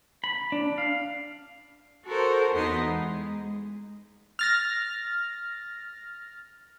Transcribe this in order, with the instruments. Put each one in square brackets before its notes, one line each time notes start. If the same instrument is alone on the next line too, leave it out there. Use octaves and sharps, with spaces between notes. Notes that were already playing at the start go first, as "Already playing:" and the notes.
[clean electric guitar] B5
D4
F5
[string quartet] F#4 A4 A#4 C5
E2 E3 B3 D#4 D#5 C6
G#3
[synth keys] F6 A6 A#6